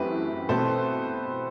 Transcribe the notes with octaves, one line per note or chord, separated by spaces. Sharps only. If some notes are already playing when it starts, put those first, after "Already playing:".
Already playing: F#2 E3 A3 C4 F#4 G4 B4
B2 A3 C4 A4 C5